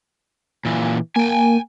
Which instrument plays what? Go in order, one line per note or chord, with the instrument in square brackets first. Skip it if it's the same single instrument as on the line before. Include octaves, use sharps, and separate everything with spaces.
[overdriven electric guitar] A#2 E3
[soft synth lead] A#3 [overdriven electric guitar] G5 G#5